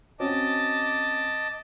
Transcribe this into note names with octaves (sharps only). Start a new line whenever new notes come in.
C4 C#4 F#4 D#5 A5 D6